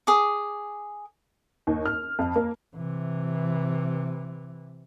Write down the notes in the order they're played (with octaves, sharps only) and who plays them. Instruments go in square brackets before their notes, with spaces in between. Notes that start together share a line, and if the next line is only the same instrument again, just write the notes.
[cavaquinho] G#4 D6
[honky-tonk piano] D#2
F6
F2
A#3
[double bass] C3 E3